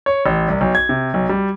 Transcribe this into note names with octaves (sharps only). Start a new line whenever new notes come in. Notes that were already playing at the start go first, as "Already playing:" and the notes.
C#5
A1
C2
B1
G#6
C3
B1
G3